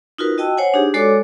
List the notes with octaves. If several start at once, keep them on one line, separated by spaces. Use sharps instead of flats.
D#4 F4 F#4 A#4 B4
F#4 D#5 G5 A5 E6
C5 C#5 F#5 G#5
D4 D#4 G4 G#4
G#3 F#4 A4 C#5 D5 D6